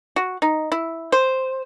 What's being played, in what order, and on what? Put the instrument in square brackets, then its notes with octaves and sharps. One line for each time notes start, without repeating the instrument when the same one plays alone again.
[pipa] F#4
D#4
E4
C5